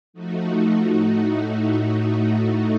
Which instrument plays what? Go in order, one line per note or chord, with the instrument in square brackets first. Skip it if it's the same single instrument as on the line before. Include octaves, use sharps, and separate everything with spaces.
[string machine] F3 A3 D#4 F#4
A2 A3 D#4 F#4